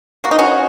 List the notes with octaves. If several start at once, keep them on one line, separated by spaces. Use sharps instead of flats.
A#3 F#4
D#4
C#4 F#4